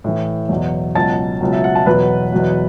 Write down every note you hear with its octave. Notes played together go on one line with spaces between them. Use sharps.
A2 E3
E2 B2 F#3
C#2 B2 F#3 A5 A6
C#2 B2 F#3
E5
F#5
A5
E2 B2 F#3 B4 B5
E2 B2 F#3